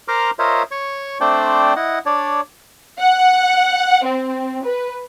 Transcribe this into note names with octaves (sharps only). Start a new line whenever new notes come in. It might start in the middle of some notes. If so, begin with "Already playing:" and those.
A#4 C5 A#5 C6 D6 F6
F4 A#4 C5 C#5 D#5 E5
C#5 C#6
A3 C4 D4 C5 D5 G5
E4 D#5 F#5
D4 C#5 D5
F#5
C4
B4